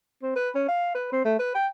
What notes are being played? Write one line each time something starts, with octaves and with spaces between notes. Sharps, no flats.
C4
B4
C#4
F5
B4
C4
A3
B4
G5